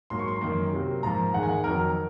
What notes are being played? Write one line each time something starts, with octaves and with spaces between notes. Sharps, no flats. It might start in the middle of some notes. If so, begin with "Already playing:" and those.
G#2 F#3 A#3 C6
C#6
C6
F#2 D#3 A#3
C3 F#3 A#3
G#2 F3 A#3 A#5
G#2 D#3 G#3 F#5
G#5
F#5
F2 D#3 F#3 A#4
A#4